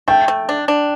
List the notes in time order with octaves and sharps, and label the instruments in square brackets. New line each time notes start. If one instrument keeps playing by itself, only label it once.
[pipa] A3 [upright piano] G5
[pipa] A3
D4
D4